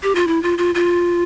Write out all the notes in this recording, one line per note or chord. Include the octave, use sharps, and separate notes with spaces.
G4
F4
E4
F4
F4
F4